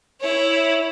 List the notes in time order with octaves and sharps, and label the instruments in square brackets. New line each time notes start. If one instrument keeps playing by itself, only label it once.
[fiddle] E4 C#5